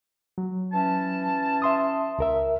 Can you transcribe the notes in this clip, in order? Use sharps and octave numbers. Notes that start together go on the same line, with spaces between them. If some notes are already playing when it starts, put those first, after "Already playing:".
F#3
E3 C#4 A5
E5 C6 D#6
C#2 A#4 E5